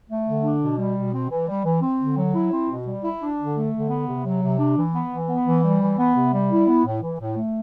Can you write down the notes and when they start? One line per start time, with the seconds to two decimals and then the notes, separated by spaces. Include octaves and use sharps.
0.09 A3
0.27 D3
0.43 D4
0.61 B2
0.78 G3
0.96 B2
1.13 C4
1.30 E3
1.48 G3
1.64 E3
1.82 C4
2.00 D3
2.17 F#3
2.34 E4
2.51 C4
2.69 B2
2.87 G3
3.04 E4
3.21 D4
3.38 D3
3.55 A3
3.73 D3
3.89 B3
4.07 C3
4.25 F#3
4.42 C3
4.59 D4
4.77 E3
4.93 B3
5.11 E3
5.29 B3
5.45 E3
5.64 G3
5.80 E3
5.98 B3
6.15 C3
6.32 G3
6.51 E4
6.67 B3
6.85 A2
7.01 E3
7.19 A2
7.36 A3